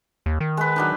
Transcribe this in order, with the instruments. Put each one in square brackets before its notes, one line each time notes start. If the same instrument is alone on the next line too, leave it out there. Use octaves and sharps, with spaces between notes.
[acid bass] D#2
D#3
[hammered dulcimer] G#3 B4
F#3 D4 D#4